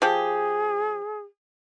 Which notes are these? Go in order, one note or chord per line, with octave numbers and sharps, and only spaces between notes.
F3 G4 G#4